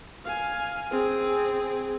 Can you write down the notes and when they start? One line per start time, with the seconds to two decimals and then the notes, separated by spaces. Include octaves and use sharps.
0.25 F5 G#5
0.91 C4 G#4